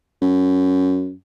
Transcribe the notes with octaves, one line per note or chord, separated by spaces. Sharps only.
F#2